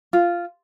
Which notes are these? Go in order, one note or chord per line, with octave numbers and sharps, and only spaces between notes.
F4